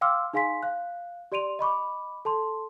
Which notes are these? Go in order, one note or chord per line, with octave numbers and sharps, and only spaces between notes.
F5 G5 C6 D6 E6 F6
D#4 G#4 F5 G#5 C6 B6
F5 F#6
G4 D5 C6 D7 D#7 F7
D#5 B5 C#6 D6
A4 A5 C6